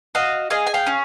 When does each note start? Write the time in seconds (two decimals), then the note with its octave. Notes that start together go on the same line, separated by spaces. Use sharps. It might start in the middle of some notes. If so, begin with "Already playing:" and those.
0.15 F#4 D#5 F5
0.50 G#4 D#5 F5
0.66 G#5
0.74 F5 G5
0.87 C#4